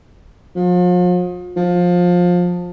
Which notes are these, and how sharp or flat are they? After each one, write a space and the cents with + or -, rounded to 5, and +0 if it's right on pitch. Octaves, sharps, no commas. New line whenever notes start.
F3 +40
F3 +20